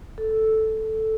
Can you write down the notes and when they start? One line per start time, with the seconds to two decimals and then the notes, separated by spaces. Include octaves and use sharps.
0.18 A4